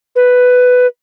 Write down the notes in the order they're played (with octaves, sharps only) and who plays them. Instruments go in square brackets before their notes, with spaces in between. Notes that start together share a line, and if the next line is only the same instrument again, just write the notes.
[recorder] B4